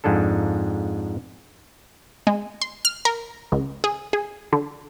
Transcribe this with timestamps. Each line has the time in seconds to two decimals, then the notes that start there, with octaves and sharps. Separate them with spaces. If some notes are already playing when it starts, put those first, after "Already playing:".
0.04 F2 G#2 G#3 D4 A4
2.27 G#3
2.61 C6
2.85 F6
3.05 A#4
3.52 C#2
3.84 G#4
4.13 G#4
4.53 D3